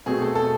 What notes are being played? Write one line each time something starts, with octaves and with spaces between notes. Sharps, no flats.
B2 F#3 A3 C4 G#4
A4
A4